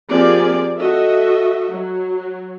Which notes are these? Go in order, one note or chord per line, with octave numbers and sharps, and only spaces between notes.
F3 A#3 C4 G4 G#4 D5
F#4 A4 D#5 E5
F#3